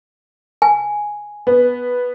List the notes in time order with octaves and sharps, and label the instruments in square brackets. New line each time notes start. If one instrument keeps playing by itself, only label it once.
[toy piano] G#5
[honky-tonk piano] B3